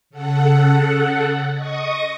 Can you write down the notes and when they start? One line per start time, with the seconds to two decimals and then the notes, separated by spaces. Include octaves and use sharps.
0.10 C#3 A4 F#5
1.55 D#5 C#6 D#6